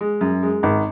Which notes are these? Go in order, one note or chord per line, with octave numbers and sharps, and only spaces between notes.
G#3
F#2
G#3
G#1